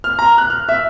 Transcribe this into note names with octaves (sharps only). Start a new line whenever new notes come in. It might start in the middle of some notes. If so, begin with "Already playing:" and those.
F6
A#5
F#6
F6
E5